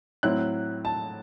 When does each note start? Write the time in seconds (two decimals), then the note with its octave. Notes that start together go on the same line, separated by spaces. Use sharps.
0.23 A2 F#3 C4 E4 F#6
0.85 A5